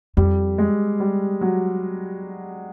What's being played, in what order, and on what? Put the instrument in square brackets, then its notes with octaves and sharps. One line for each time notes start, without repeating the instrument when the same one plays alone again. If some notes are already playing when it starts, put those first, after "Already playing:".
[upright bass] F2 [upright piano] G3
[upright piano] G#3
G3
F#3